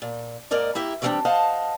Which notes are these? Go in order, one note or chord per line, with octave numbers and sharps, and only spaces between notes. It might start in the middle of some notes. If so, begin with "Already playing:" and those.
A#2
G#2 A#3 A#4 D5 D#5
A#3 E4 G4 E5
D3 E3 F#3 G3 C4 D4
C5 D#5 F5 F#5 A5